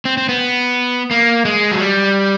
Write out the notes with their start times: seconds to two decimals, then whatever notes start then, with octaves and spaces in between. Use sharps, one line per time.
0.05 C4
0.17 C4
0.29 B3
1.11 A#3
1.45 G#3
1.71 F#3
1.80 G3